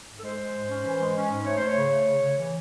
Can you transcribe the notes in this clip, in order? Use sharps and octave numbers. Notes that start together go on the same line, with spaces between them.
G#2
A4
G#3 C5
G#3
G#2
C#4
E3
G#3
C#4
G#2
A3 C#5
A3 C5
C#5
C#3
A3
C#3
C#3
E3